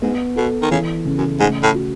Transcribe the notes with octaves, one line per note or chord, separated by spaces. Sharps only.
G#2 B3
B2 A4
D#3
C#3 E3
C#3
F#2
G#2 A3
A2
F#4